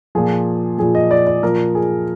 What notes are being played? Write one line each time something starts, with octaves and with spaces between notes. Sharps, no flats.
A#2 F3 G#4
A#2 F3 G#4
D#5
D5
D5
A#2 F3 A#4
G#4